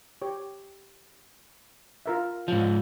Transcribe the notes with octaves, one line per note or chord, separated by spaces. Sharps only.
G4 C#5
F4 A#4 E5
G#2 F3 F4